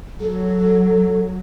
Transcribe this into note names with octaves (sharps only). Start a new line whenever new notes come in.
F#3 A4